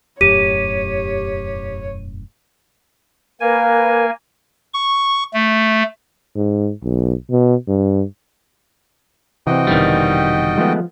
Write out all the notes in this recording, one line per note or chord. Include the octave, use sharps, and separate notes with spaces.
E1 F#2 A2 G4 C#5 D#7
A#3 A#4 B4 F5 G#5
C#6
A3
G#2
B1
B2
G2
C3 E3 C4 F#4 D#5 G5
F1 B2 D3 D#3 G3
F3 G#3 A3 B3